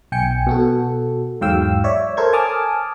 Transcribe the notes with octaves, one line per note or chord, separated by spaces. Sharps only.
B1 G5 G#5 C#7
B2 F#4 A4
E2 G#2 F#3 F5 G5 E6
C#5 D5 E5
A4 A#4 C5 C#5 G#6
G#5 A5 D6 D#6 F6